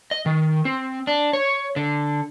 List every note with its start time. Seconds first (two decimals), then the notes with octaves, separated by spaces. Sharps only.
0.11 D#5
0.26 D#3
0.65 C4
1.07 D4
1.33 C#5
1.76 D3